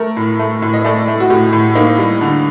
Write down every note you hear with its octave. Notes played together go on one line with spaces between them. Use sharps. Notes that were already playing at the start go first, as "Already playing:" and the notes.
Already playing: A3 A#4
A2
A3
A2
D#5
A3 D5
A3
F#4
A2 G4
A2
A#3 D#4
G3
D3